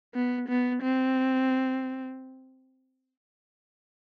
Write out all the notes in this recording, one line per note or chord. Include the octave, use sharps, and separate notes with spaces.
B3
B3
C4